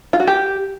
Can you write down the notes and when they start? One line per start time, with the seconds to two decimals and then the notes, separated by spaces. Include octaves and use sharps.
0.13 F4
0.20 F#4
0.27 G4